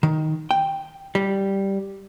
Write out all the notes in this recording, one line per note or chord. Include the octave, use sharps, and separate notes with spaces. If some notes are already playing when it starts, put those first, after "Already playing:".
D#3
G5
G3